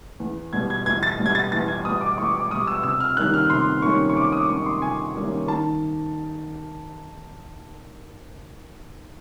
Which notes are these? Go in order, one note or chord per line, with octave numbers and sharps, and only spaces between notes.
E2
B2 G3 B3 G#6
G#6
E2 G#6
A6
B2 G3 B3
G#6
A6
E2 A6
G#6
B2 G3 B3 D#6
D6
E2 C#6
D6
B2 G3 B3 D#6
E6
C3 E6
F6
D#3 G3 A#3 C#4 F#6
F6
C3 C6
D#3 G3 A#3 C#4 C#6
C#6
C3 D6
D#6
D#3 G3 A#3 C#4 C#6
C6
C3 G#5
D#3 G3 A#3 C#4
D#3 A5